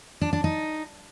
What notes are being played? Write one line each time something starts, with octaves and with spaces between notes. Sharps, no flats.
D4
D4
D#4